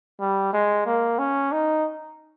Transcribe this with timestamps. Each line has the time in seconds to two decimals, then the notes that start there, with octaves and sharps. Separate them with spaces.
0.21 G3
0.53 G#3
0.86 A#3
1.19 C#4
1.52 D#4